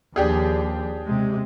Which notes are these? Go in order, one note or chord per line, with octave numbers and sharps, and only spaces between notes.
D#2 F3 D4 G4 G#4
C3 G#3